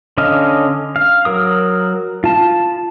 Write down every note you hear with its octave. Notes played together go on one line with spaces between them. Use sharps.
D3 C#4 D#5 F5
F5
F#3 A#4 D#6
F4 A5